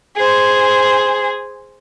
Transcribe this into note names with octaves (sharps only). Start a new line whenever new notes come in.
G#4 C5